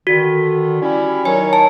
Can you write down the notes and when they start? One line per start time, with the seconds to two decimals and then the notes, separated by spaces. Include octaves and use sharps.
0.07 D3 D#3 F#4
0.81 G3 C#4 E4
1.25 D#3 F#3 C#5 G#5
1.53 A5